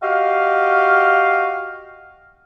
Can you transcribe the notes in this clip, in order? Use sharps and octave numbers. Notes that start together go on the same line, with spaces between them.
F#4 G4 D#5 F5